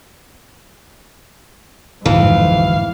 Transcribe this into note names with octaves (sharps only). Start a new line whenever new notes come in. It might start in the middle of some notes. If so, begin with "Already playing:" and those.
D1 G#1 F2 G#2 E3 F#3 F5